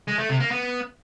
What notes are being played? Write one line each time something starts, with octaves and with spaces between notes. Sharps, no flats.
G#3
A3
C3
A#3
B3